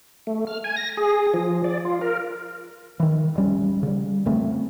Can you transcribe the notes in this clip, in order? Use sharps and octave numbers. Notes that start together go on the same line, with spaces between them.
A3
F6
G#5
A#6
G#4
F3
D5
F4
A#4
D#3 E3
E1 A1 G3 C#4
C#3 G3
F2 C#3 A3 C4